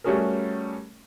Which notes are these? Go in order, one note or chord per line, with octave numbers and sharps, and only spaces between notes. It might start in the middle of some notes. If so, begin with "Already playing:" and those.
G3 A3 C#4 F#4 G#4 A#4